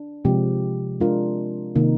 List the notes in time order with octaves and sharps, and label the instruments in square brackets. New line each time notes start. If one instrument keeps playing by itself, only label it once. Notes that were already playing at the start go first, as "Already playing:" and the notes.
Already playing: [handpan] D4
C3 F3 G#3 C4 G4
G#3 D4 F4 A#4
C3 D#3 A#3 D#4